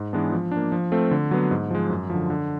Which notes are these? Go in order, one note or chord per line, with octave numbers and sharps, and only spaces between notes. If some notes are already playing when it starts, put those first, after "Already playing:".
Already playing: G#2
E3 G#3 B3 D4
F3
D4
A#3
F3
A3 C4 F4 A4
D3
F#3 B3
G#2
F3 G#3
F#2
D3 F3
D3